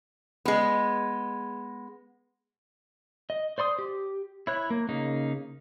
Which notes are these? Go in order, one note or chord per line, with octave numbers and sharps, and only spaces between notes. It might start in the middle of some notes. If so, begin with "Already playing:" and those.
G#3 B3
D#5
C5 D5 C6 D#6
G4
E4 C#5 F#6
A#3
C#3 A#3 D#4